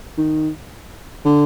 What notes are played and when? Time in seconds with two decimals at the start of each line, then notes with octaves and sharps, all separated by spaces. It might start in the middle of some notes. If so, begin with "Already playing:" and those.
0.17 D#3
1.25 D3